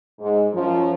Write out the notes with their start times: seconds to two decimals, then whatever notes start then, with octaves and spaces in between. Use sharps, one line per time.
0.20 G#2
0.53 F#2 F3